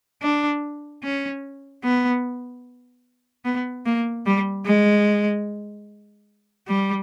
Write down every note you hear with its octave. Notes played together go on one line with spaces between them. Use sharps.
D4
C#4
B3
B3
A#3
G3
G#3
G3